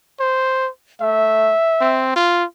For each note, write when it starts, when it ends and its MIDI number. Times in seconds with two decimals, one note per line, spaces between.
0.20 0.69 72
1.01 1.54 57
1.01 2.06 76
1.81 2.13 60
2.16 2.44 65